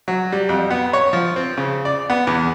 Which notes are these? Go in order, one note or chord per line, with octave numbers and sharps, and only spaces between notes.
F#3
G3
F2
B3
C#5
F3
C4
C#3
D5
B3
E2